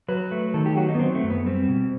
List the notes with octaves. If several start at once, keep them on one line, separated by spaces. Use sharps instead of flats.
F#3 B4
A3
D#3 A4
G4
F#3 F#4
D#4
B3
F#3 C4
A3
F#2
B3
G3 C4
B2